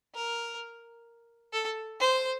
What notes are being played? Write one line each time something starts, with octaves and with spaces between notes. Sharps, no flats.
A#4
A4
C5